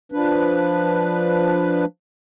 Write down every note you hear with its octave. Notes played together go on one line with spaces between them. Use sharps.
F3 D4 B4